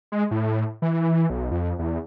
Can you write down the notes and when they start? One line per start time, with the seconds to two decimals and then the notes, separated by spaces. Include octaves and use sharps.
0.12 G#3
0.31 A2
0.82 E3
1.30 B1
1.51 F2
1.79 E2